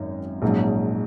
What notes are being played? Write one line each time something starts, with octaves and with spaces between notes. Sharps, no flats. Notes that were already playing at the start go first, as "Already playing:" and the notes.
Already playing: G#1 F#2 D#4
A#1 G#2 F#3 C#4